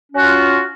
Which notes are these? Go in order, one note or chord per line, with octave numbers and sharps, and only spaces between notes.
C#4 F4 F#4